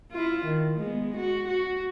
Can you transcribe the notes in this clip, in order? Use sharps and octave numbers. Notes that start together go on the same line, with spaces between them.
E4 F4
D#3
G#3 B3
F#4
F#4